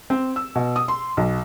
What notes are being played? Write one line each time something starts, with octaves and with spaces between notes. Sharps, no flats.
C4
E6
B2
D#6
C6
B1